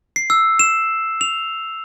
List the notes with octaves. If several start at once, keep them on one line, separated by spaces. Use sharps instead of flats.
C7
E6
E7
F7